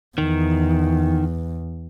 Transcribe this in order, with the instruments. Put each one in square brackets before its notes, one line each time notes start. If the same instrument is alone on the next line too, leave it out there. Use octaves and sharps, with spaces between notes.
[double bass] E2 [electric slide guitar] D#3